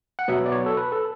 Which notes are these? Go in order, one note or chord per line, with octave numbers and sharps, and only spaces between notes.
F#5
B2 F#3 B3 E5
D5
C#5
A4
B4
A4